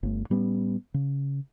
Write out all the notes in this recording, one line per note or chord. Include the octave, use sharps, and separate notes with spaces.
G1 A3
A2 G3 B3 C#4
C#3